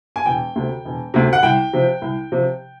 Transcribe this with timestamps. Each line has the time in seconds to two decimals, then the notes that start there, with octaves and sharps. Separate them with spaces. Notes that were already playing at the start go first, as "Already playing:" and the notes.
0.16 G#5
0.26 E1 G5
0.56 D2 C3
0.85 E1
1.14 D2 C3
1.33 F#5
1.43 C2 G5
1.73 C3 F3
2.02 C2
2.32 C3 F3